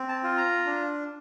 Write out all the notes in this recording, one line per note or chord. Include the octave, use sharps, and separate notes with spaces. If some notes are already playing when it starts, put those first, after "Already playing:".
Already playing: C4
A5
F4
A#5
D4